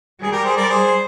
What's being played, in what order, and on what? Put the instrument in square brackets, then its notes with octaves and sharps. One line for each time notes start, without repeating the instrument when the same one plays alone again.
[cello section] G3 [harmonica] G#4
[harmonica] G4 A#4
G#4 C5
A#4 D5
G#4 C5